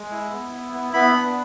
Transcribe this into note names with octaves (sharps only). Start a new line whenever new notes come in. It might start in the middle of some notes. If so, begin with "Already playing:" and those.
Already playing: G#3
E4
B3
E4
B3
B3 B5
D4